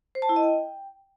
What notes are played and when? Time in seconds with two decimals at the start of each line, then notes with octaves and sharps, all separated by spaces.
0.15 C5
0.22 A5
0.29 E4
0.36 D#5
0.43 G5